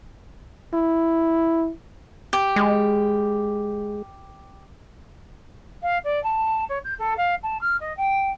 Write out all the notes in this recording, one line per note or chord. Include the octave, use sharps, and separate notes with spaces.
E4
G4
G#3
F5
D5
A5
C#5
G6
A4
F5
A5
F6
D#5
G5